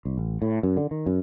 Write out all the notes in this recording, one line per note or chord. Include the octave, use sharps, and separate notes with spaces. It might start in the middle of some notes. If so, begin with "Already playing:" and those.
C2
A1
A2
F#2
D3
D#3
F#2